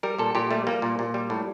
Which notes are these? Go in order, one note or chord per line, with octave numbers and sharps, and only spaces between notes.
G3 A#4
A#2 A4
A#2 G4
G3 A3
G3 A#3
A#2
A#2
G3
A2